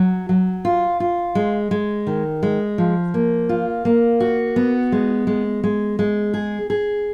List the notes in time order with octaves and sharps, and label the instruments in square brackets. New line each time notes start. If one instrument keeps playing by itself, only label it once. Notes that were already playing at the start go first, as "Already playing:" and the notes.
Already playing: [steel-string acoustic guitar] F#3
F#3
F4
F4
G#3
G#3
D#3
G#3
F3
A#3
F4
A#3
F#4
B3
G#3
G#3
G#3
G#3
G#4
G#4